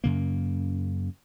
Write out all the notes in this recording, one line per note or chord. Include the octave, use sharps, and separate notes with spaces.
F#2 C#3 A#3